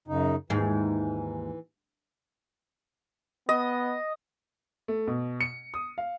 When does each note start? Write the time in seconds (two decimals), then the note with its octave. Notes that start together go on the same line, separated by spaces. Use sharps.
0.08 F#2 C#3 D#4
0.50 D#2 G#2 E3
3.49 B3 D#5
4.88 A3
5.07 B2
5.41 C#7
5.74 D#6
5.98 F5